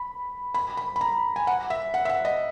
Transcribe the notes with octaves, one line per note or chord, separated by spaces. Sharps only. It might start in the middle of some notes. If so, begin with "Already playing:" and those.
Already playing: B5
B5
B5
B5
A#5
G#5
F#5
E5
F#5
E5
F#5
D#5